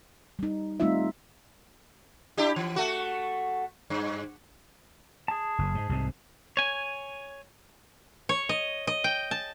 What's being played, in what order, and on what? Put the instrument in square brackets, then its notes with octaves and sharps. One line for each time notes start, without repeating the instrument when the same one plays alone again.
[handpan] G3 D#4
G3 A3 C4 D#4 F4 E5
[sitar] D4 E4 G4
E3
A3 F#4
G2
[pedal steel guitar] G#4 A5
[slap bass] F#1
G#2
C2 G#2
[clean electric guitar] C#5 G#5
[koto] C#5
D#5
D#5
G5
A5